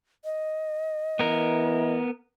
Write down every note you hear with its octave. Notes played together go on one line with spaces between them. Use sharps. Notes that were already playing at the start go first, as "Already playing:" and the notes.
D#5
E3 B3 A#4